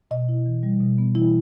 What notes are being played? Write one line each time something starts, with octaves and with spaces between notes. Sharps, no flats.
B2 D#5
E4
E3
G3
B2
B3
E3 E4